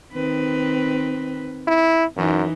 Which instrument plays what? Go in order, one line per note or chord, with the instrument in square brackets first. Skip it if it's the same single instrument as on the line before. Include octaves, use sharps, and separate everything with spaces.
[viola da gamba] D#3 C4 B4
[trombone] E4
[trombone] F#2 [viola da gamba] E3 D#4